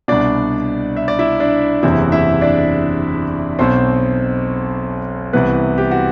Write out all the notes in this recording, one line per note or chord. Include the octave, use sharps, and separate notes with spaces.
C2 B2 D4 D5
E5
D5
E4 E5
D4 D5
F#1 E2 C3 E3 E4 E5
E4 E5
D4 D5
B1 B2 C4 C5
C2 C3 E3 B3 B4
G4
F#4